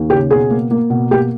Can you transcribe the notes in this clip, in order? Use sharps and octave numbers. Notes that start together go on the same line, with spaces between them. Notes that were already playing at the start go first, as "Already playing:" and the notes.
Already playing: D#2
C#3 G4
B2 G#4
A#3
A#3
B2
A#3 G4